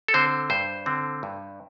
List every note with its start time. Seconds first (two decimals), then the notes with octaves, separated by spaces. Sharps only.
0.08 A4
0.14 D3 C4 C5
0.50 G2 C5
0.86 D3 C4
1.23 G2